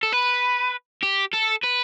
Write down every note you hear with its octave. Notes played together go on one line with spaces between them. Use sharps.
A4
B4
G4
A4
B4